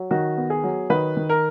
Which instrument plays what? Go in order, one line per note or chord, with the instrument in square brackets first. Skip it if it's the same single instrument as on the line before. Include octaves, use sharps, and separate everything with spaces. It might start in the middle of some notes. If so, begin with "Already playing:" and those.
Already playing: [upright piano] F#3
D#3 F#4
B3
G#4
F#3
D#3 B4
D#3
A#4